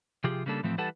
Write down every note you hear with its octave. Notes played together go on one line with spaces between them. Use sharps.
C3 F3 F4 G4 G#4
C#3 G3 A#3 D4 A4
A2 E3 F3 A3 C4
E3 G3 A4 B4 F#5 A5